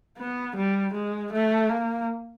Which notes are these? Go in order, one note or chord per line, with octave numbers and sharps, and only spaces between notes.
B3
G3
G#3
A3
A#3